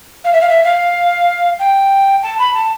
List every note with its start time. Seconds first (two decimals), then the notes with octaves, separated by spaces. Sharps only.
0.24 F5
0.33 E5
0.41 F5
0.49 E5
0.64 F5
1.59 G5
2.23 A5
2.39 B5
2.54 A5